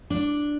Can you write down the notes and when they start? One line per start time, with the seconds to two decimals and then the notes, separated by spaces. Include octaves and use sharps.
0.10 D4